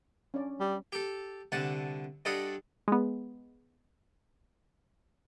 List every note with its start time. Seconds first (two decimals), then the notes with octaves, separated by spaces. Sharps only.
0.34 C#4 D4 D5
0.60 G3
0.92 G4 A4
1.52 C2 D3 F#5 A5
2.25 G2 A4 D5 D#5 F#5 B5
2.88 G#3 B3